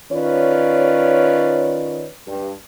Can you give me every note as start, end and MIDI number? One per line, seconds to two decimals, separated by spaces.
0.12 2.08 51
0.12 2.08 61
0.12 2.08 65
0.12 2.08 71
0.12 2.08 73
0.12 2.08 74
2.28 2.51 43